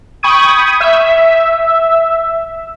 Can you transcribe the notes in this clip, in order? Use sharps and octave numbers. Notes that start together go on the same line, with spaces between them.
G5 B5 C#6 D#6 G#6 D#7
E5